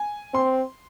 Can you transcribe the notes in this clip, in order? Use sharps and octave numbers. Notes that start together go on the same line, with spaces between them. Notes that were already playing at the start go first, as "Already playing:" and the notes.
Already playing: G#5
C4 C6